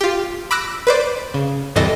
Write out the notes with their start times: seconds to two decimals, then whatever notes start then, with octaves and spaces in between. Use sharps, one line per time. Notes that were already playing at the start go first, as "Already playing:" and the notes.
0.01 F4 G4
0.51 B5 D6 E6 F#6 A#6
0.87 B4 C5 D5
1.34 C#3
1.76 D2 G2 C3 E3 A4 D#5